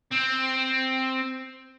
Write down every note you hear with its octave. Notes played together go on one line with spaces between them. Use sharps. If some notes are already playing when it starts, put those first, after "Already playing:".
C4